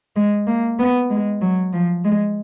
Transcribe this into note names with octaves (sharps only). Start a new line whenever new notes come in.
G#3
A#3
B3
G#3
F#3
F3
G#3